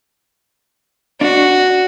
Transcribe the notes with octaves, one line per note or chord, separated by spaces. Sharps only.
D4 F#4